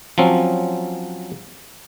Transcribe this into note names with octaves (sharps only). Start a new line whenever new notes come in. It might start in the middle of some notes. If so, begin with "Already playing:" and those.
F3 F#3 C4 C#4